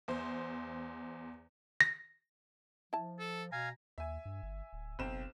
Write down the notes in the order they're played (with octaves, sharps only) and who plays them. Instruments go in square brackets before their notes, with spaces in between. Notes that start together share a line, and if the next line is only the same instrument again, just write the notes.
[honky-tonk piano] E2 C5
[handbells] A#6
[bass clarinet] F3 [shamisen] E4 A5
[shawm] A4
[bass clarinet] B2 [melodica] F5 G#5 [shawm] A#5
[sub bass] D#2 [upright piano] E5 G#5
[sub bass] G2
G1
D1
[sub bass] F#1 [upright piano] B1 C4 E7